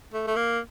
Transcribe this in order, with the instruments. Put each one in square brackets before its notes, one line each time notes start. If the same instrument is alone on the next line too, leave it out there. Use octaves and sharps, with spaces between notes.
[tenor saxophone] A3
A3
A#3